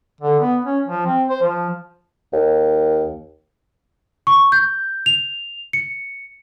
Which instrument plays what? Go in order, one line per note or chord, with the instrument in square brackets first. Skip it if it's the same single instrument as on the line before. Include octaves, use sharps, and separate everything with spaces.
[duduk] D3
B3
C#4
F3
C4
C5
F3
[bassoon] D#2
[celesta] C#6
G6
F7
C#7